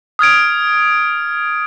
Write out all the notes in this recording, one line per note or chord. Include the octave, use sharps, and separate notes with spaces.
D#6 F6 G#6 D7